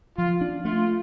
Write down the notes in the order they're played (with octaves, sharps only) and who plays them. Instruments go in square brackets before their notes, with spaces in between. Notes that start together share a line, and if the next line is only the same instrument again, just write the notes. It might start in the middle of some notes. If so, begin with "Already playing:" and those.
[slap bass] F3 [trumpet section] F4
[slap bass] D4
[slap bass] A3 [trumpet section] F4